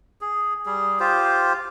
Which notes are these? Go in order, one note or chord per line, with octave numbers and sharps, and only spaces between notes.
G#4
G3 G#4
F4 G4 C5